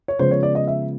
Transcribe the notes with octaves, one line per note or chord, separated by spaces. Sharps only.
C#5
C#3 F3 G#3 B3 C5
C#5
D5
D#5
E5